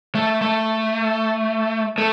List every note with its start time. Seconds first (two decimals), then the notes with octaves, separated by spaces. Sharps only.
0.15 A3
0.41 A3
1.98 A3